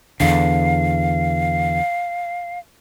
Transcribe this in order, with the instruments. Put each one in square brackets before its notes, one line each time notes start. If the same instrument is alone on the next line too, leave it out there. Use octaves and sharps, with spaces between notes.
[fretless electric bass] E2 D3 [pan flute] F5